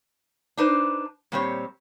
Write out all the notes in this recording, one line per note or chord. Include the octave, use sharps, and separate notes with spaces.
D4 D#4 B4 C5
A#2 G3 C4 G4 C#5